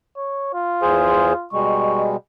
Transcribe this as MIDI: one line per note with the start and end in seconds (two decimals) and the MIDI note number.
0.17 0.54 73
0.54 1.47 65
0.82 1.33 40
0.82 1.33 68
0.82 1.33 72
1.53 2.16 47
1.53 2.16 55
1.53 2.16 56
1.53 2.02 85